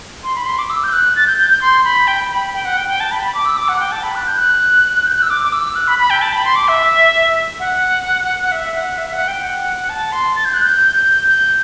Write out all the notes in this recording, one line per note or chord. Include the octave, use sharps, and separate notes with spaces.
C6
B5
C6
D6
E6
G6
F#6
A6
G6
G6
G6
C6
B5
G5
B5
G5
F#5
G5
G5
A5
B5
B5
D6
E6
D6
F#5
G5
A5
B5
F#6
G6
F#6
G6
F#6
E6
D6
D6
E6
F#6
B5
B5
G5
A5
B5
C6
D6
E5
F#5
E5
F#5
E5
E5
F#5
G5
F#5
A5
C6
A6
G6
F#6
G6
G6